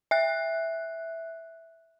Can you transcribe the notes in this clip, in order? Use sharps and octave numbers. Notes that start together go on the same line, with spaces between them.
E5 F#6